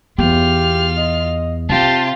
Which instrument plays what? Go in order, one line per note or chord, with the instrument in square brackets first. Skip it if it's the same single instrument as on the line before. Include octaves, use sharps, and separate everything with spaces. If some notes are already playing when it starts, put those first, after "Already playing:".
[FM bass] E2 [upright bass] B3 [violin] F4 F6 [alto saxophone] G4
[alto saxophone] D#5
[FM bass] C3 [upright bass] D4 [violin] F4 G4 [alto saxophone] A5